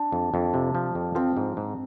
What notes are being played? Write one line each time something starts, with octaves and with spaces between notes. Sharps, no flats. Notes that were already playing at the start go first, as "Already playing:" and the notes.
Already playing: D4
F2
F2
C3
F3
F2
F3 C4
G#2
G#2